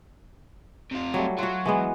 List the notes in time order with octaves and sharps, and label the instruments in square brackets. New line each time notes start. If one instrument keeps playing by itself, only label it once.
[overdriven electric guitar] C3 F4
[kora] F#3 G3 A3
[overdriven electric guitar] F#3 [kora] F4 F#4
[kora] E3 G#3 B3